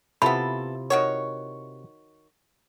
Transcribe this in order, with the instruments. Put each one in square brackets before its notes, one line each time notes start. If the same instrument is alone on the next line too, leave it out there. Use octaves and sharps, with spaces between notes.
[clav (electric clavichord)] C3 E4 F4 [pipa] B3 A4 [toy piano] B5
[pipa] D#3 F#4 C#5